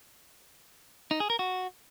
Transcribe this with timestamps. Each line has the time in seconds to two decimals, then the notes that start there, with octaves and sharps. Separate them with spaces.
1.11 D#4
1.20 G#4
1.30 A#4
1.39 F#4